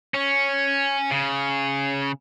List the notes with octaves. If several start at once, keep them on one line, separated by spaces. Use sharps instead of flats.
C#4
C#3